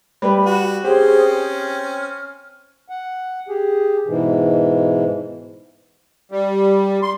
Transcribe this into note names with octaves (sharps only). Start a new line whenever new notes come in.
G3 B4
F#4
C4 C#4 G4 G#4 C5 C6
F6
F#5
G4 G#4
G#2 B2 E3
G3
C6